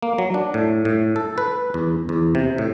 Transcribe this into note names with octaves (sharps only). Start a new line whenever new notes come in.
A#3
F#3
D4
A2
A2
A4
B4
E2
E2
C3
A2